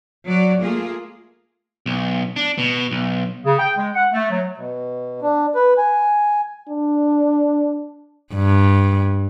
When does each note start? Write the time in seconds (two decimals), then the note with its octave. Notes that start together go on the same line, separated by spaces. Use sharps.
0.25 F#3 D5
0.61 A3 A#3 F4 G#4
1.86 B1
2.36 D4
2.58 B2
2.91 B1
3.45 C#3
3.59 G5
3.77 G#3
3.94 F#5
4.12 A3
4.30 F#3
4.58 B2
5.22 D4
5.55 B4
5.78 G#5
6.69 D4
8.34 G2